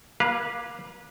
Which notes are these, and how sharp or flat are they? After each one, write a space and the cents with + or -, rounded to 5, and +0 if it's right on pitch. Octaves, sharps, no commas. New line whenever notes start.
A#3 +20 B4 -25 F5 +0